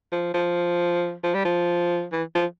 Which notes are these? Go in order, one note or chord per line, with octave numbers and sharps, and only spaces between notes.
F3
F3
F3
G3
F3
E3
F3